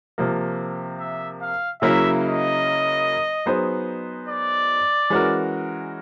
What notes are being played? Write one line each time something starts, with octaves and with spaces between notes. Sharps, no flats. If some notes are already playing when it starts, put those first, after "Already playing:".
C3 F3 A#3
E5
F5
C#3 F#3 A#3 C#4 E4 E5
D#5
F#3 B3 D#4 G#4 C5
D5
E3 G#3 C#4 F#4 A#4